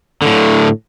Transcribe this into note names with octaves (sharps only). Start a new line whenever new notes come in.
A2 D3